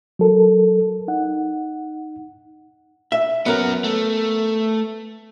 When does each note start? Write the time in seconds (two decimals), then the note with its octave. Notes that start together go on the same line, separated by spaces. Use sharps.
0.19 F#3 A4 A#4
1.08 D#4 F#5
3.12 E5
3.46 F#3 B3 C#4 A#4
3.84 A3